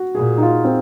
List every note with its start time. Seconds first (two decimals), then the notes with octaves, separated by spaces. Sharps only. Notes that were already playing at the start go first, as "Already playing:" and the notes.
Already playing: F#4
0.15 A#2 G#4
0.38 D#4
0.43 F4
0.65 C4